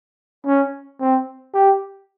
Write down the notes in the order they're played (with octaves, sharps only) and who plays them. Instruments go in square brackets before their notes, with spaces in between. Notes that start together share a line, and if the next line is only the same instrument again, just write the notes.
[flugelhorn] C#4
C4
G4